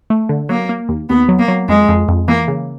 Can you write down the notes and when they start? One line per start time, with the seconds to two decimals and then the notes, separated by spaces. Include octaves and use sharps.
0.10 A3
0.29 D3
0.49 F#3 A#3
0.69 A#3
0.89 D#2
1.09 D#2 B3
1.29 F#3
1.39 A#3
1.48 F#3
1.69 F2 G#3
1.89 F2
2.09 F2
2.28 E3 A#3
2.48 C#3